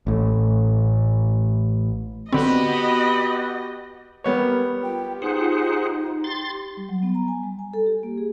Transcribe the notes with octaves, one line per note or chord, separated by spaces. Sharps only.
A1 A2
D3 B3 C4 F#4 G4 D#5 B5
G3 B3 A#4 C#5
F4 G4 G5
D#4 G#4 C5 F#5
G4 C6 A6
G3
F#3
B3
A#5
G#5
G3
G#5
A4
G4
A#3
G#4